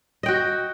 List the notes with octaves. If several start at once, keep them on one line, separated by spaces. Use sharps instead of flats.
F#4 D#5 G5